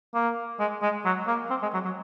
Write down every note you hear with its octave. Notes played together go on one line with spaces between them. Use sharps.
A#3
G#3
G#3
F#3
A#3
C4
G#3
F#3
F#3